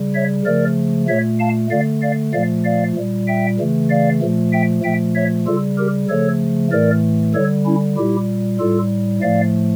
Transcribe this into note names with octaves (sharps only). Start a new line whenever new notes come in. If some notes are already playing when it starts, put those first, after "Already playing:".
Already playing: C#3 G3
C#5 E5
C#3 F3 A3 A#4 D5
A#2 A3 C#5 E5
F5 A5
D3 A3 D5 F5
D5 F5
A#2 F3 A3 D5 F5
D5 F5
A#2 G3
E5 G5
C#3 E3 A3
D5 F5
A#2 F3 A3
E5 G5
A#2 F3 A3 E5 G5
C#5 E5
C#3 G3 F4 A4
G4 A#4
C#3 F3 A3 A4 C#5
A2 E3 A3 A#4 D5
D3 G3 A4 C#5
C#4 E4
A#2 G3 E4 G4
A2 G3 F4 A4
A2 F3 A3 D5 F5